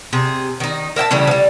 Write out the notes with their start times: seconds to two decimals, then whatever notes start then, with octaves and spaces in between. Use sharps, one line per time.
0.13 C3 G#4
0.60 D#3 D#4
0.96 A#4 E5 G5 A5
1.11 C#3 E3 G3 A3
1.27 F3 G3